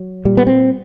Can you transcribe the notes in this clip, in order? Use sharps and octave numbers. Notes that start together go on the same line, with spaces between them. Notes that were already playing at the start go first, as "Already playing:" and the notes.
Already playing: F#3
A#2 G3
B3
C4